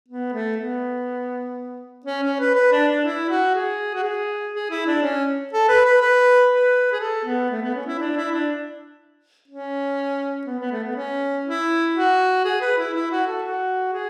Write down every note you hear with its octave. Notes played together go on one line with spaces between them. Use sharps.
B3
A3
B3
C#4
C#4
B4
B4
D4
D4
E4
F#4
G#4
F#4
G#4
G#4
E4
D4
C#4
A4
B4
B4
B4
B4
G#4
A4
B3
A3
B3
C#4
E4
D4
E4
D4
C#4
B3
B3
A3
B3
C#4
E4
F#4
G#4
B4
E4
E4
F#4
A4
F#4
G#4